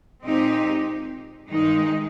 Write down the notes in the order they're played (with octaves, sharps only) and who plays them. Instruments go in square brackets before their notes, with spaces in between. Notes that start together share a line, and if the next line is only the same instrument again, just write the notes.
[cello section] A#2 G#3 C4 D#4 G4
G2 D#3 G#3 D#4